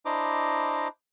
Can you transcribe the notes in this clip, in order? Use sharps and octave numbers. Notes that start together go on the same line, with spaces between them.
D4 E4 C5 D#5 A#5 D6